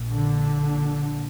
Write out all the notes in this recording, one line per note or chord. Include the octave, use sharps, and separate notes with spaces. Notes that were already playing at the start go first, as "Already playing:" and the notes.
Already playing: A#1 A#2
D3